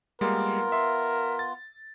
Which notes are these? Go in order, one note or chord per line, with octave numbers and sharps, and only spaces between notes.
G3 G#3 A#3 B3 F4 A#4
E5 C6
A6